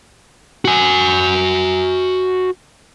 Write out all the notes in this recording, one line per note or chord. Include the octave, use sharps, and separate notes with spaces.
F#4 G#5